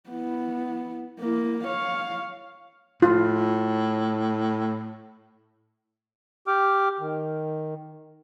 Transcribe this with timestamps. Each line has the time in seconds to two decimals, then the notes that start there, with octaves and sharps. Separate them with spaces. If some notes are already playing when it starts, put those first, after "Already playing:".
0.10 B3 E4
1.20 A#3 E4
1.64 C#5 F5
3.02 A2 F4
6.47 G4 G5 D6 F6
7.00 D#3